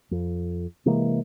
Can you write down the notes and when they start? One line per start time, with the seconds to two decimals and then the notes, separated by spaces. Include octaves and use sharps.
0.11 F2
0.86 C3 E3 G#3 A#3